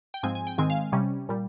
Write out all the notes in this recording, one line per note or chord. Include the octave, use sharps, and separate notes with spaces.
G5
G#2 F3 G#3 C4 G#5
G#5
G5
G#2 D#3 G#3 C4 G#5
F5
C3 G3 C#4
A#2 G3